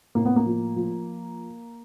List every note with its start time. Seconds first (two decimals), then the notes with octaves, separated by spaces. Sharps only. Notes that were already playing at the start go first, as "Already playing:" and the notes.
0.15 A2 A#3
0.25 B3
0.36 A#3
0.46 F3
0.76 F3